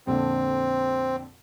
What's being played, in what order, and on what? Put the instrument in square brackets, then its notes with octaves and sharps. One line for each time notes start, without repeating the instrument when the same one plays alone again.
[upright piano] F2 A#2 D3 [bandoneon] C4